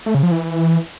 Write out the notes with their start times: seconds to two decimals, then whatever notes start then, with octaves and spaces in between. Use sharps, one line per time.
0.06 A3
0.15 C#3
0.23 F3
0.31 E3